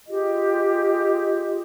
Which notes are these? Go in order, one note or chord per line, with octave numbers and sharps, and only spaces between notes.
F4 G4 G#4 D#5